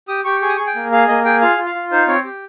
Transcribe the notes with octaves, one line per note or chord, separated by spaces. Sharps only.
G4 D#6
G4 C#6
G#4 C#6
D#6
G#4 C#6
G5
A#3
G#4 F5
A#3 D#5
G#4 G5
F4 F5
F4
F5
F4
D#4 C5
C4 C#5
G4